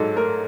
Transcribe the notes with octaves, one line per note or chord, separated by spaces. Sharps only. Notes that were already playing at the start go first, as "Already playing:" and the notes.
Already playing: G#2 F#3 A4
A3 A#4